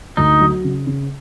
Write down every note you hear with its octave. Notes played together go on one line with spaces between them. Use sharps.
D2 D#4
F#3
C#3
C#3